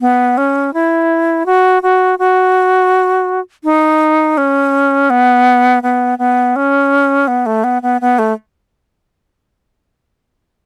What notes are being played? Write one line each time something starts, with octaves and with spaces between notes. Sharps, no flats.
B3
C#4
E4
F#4
F#4
F#4
D#4
C#4
B3
B3
B3
C#4
B3
A3
B3
B3
B3
A3